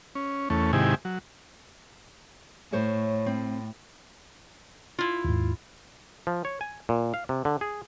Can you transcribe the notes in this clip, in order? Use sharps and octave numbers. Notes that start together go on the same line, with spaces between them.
C#4
E2 A3 C#4
G#2 C3 D#3 E4 G4 G#5
F#3
A2 C5 C#5 E5
C4
E4 F4
D#2 G#2
F3
C#5
G#5
A#2
F5
C3
D3
G#4